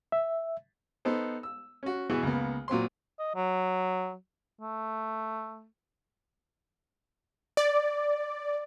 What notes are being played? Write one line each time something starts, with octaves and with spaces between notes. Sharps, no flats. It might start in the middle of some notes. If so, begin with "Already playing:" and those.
E5
B3 D#4 A4 C5
E6
C#4 F#4
B2 E3 B3 F#4 G#4
C#2 A#3 B3
A#2 F#3 C4 C6
D#5
F#3
A3
D5